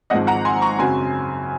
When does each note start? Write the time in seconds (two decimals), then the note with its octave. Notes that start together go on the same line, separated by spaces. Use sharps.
0.10 G#1 G#2 F3 G#3 C4 D#5 F#5
0.27 F#5 A#5
0.45 G#5 C6
0.62 A#5 C#6
0.79 F#2 C#3 F#3 C4 G#5 C6